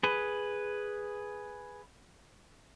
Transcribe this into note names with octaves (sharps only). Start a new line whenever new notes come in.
G#4 B4